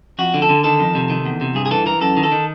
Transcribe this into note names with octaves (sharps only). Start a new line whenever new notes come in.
F2 F#4
D3
A4
D3
D#3 A4
F2
C3
D#3
E2
C3
G2 G#4
G#4
E3 A4
E3 A#4
F#2 A4
D#3
A4
D#3